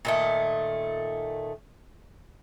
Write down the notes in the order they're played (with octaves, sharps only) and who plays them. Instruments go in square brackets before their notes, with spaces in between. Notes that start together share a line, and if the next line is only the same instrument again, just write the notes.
[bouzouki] A#2 D#3 A3